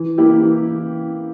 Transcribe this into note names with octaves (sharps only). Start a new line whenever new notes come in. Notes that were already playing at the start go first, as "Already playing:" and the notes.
Already playing: E3
A#3 E4 G4
E3